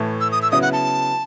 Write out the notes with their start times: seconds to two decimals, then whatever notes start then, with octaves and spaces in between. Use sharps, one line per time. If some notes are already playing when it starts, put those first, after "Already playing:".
Already playing: A2 E3 A3
0.21 E6
0.32 D#6
0.42 E6
0.51 C#3 F#3 B3 E4 D#6
0.62 F#5
0.72 A5